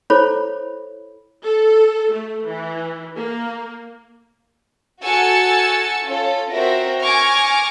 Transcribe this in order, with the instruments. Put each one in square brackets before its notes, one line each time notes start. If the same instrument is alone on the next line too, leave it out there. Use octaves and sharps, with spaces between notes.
[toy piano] E4 A4 C5 C#5 B5 D6
[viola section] A4
A3
E3
A#3
[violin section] F#4 A4 G#5 E6 A6 C#7
C#4 F4 A4
C4 F#4 A#4 E5 A#6
G#5 C#6 D6 F6 A#6